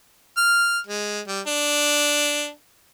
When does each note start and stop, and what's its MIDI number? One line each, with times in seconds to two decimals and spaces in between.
0.37 0.79 89
0.87 1.20 56
1.28 1.40 55
1.47 2.50 62